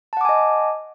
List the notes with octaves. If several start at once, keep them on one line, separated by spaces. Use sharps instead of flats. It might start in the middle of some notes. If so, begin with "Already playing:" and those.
D#5 F#5 G#5 A5 D6